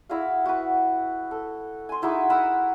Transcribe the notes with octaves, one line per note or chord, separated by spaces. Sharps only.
E4 F#4 G#4 F5
F#4 B4
A4
G#5 C6
D#4 E4 F#4 G#4
A#4 F#5 B5 E6